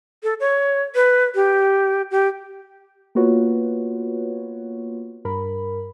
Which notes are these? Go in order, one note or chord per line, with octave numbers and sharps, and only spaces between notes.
A4
C#5
B4
G4
G4
A#3 B3 F4 F#4 B4 C#5
G2 A#4 B5